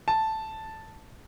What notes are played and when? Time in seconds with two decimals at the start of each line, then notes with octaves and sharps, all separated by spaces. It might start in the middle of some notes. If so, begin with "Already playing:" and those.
0.08 A5